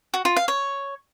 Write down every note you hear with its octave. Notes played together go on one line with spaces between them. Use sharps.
F#4
F4
F5
C#5